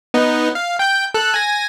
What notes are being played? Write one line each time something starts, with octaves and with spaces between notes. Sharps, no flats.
B3 D#4
F5
G5 G6
A4 F#6
G#5 A#6